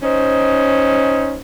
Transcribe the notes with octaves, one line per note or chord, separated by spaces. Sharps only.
C#4 D#4 C5